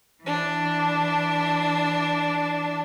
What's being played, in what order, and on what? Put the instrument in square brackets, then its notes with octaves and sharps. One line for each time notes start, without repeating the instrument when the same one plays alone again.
[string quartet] E3 D4